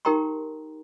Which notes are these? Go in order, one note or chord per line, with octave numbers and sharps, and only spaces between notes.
D#4 G4 A#4 G5 A#5 C6